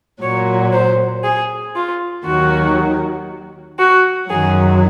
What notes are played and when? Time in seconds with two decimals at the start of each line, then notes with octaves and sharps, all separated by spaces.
0.21 A#2 F#3 C#5
0.72 C5
1.23 G#4
1.75 F4
2.25 D#2 D#3 F#3 F#4
3.78 F#4
4.29 F#2 D#3 F#3 G#4